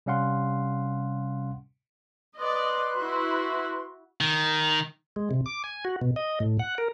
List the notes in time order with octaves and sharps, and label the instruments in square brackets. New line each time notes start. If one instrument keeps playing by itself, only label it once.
[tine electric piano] C3 G3 C#4 F5 F#5 C6
[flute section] B4 C6 F#6 [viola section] D5 D#5
[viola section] E4 F#4
[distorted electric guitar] D#3
[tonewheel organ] G#3
C3
D6
G#5
F#4
B2
D#5
A2
F#5
A#4